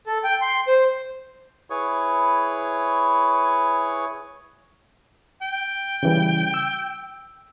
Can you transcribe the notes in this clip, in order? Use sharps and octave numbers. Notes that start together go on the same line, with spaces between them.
A4
G5
C6
C5
E4 G#4 B4 C#5 C#6
G5
C#3 E3 G3
E6